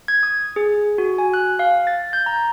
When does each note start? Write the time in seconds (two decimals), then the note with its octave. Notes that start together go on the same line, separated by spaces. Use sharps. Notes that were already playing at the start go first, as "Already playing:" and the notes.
0.08 G#6
0.23 D#6
0.56 G#4
0.98 F#4
1.18 G#5
1.34 F#6
1.59 F5
1.87 A6
2.13 G6
2.26 A#5